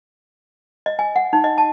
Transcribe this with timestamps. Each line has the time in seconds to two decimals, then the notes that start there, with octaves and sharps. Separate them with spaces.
0.86 D#5
0.99 G#5
1.16 F#5
1.33 D#4
1.44 D#5
1.58 A5